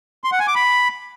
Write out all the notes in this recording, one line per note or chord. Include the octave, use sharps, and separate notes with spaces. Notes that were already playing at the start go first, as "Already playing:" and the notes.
C6
F#5
G#5
D6
B5